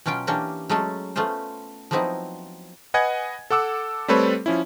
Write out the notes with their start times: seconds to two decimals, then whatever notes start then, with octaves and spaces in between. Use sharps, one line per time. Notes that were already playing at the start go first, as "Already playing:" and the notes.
0.06 B2 F#3 C#4 F4 G5
0.27 E3 A#3 C#4 D4 G4
0.69 F#3 G#3 A3 C#4 A4
1.16 A3 B3 C#4 F4 C5
1.91 F3 F#3 B3 C4 D#4 E4
2.94 B4 D#5 F#5 G#5 G#6
3.50 A4 F#5 D6 E6
4.08 G3 A3 C4 A4 B4 C#5
4.46 F3 C#4 E4